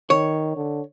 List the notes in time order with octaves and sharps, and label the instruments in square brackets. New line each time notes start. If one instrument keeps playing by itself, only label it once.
[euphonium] D#3 [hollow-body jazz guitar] C#5
[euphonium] D3